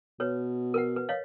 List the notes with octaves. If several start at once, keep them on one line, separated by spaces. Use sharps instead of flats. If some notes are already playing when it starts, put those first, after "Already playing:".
B2 B4 C#5
A#4 B4 F#5
B4
C#5 D#5 F5